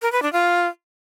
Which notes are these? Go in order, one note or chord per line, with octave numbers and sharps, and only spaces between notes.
A#4
B4
D4
F4